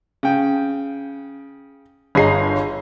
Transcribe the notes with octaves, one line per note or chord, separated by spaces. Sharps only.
C#3 G5
G1 G#4 C#5 D#5 A#5 C7